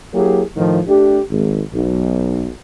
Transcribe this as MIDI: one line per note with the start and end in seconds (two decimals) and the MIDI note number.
0.14 0.42 54
0.14 0.42 58
0.14 0.42 64
0.14 0.42 67
0.14 0.42 68
0.57 0.80 45
0.57 0.80 51
0.57 0.80 53
0.87 1.20 57
0.87 1.20 62
0.87 1.20 67
1.31 1.62 32
1.73 2.46 35